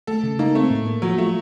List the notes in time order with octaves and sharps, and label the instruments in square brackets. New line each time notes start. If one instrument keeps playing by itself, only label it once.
[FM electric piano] A3 [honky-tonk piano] A4
[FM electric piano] C#3
[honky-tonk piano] A#3 [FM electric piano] D#4
[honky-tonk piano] A3 [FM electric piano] C4
[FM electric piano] A2
A#3
[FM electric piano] F3 [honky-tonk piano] F#3
[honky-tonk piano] A3 [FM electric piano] F4